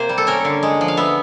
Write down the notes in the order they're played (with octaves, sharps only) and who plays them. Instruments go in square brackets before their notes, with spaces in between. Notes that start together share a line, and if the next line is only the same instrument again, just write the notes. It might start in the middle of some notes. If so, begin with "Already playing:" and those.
Already playing: [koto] C3 A#3 C5
G3
A4
C#4 A#4
D3
G#3
F3
F5
B3 E5